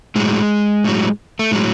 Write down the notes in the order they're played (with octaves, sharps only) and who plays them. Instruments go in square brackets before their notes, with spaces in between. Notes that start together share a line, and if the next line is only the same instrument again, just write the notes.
[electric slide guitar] A2 F#3 G#3
A2 F#3
A3
A2 F#3 G#3